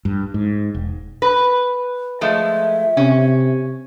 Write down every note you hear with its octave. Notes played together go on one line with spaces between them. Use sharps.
G2
G#2
E1
B4
F3 G#3 A3 E5
C3 C#4